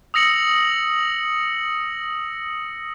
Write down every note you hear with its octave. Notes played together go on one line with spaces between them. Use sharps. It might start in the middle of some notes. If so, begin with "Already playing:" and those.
D#6 E6 A#6 C#7 F#7